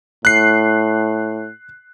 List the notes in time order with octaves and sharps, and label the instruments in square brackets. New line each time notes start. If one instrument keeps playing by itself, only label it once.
[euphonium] A2 [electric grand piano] F#6 C7